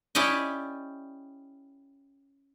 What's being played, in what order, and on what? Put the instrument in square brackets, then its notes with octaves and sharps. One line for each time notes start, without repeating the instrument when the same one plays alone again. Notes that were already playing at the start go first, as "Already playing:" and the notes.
[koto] C#4 E4 G4 D5 D#5